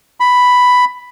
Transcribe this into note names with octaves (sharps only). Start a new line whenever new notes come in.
B5